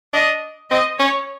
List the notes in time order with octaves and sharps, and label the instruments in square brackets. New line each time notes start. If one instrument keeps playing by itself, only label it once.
[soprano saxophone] D4 [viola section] D#5
[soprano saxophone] C4 [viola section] D#5
[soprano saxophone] C#4 [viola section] C#5